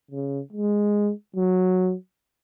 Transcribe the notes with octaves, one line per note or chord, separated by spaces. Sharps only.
C#3
G#3
F#3